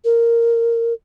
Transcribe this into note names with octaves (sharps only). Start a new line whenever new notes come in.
A#4